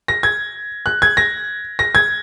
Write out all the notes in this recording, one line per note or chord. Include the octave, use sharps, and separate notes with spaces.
A#6
G#6
F#6
G#6
A#6
A#6
G#6